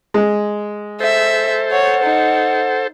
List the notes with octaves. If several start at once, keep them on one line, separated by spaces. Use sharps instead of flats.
G#3
A4 C5 E5
C#5 F#5
D#4